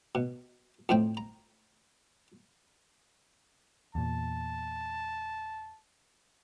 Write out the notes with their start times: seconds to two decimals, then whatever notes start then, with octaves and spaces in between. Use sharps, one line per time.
0.15 B2
0.89 F2 A2 C4 G5
1.17 A#5
3.95 E2 A#2 A5